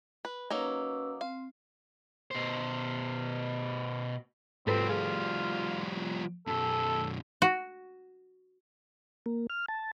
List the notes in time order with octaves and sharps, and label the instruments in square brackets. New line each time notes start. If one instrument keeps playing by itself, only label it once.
[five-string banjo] B4
[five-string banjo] F#3 A#3 D#4 [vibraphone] C#4 B4 E6
[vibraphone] C4 [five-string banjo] F5
[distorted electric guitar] B2 C5
[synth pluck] G#2 A4 B4 [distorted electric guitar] F3 G3 [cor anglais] C4
[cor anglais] F4 [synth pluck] G#4
[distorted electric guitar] F#2 B2 [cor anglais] A4
[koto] F#4
[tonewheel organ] A#3
F6
A5